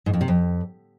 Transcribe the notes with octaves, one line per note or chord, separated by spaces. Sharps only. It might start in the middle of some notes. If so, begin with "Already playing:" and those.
G#2
F2
C3
F2